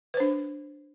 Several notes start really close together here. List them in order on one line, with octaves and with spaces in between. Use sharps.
B4 C5 D4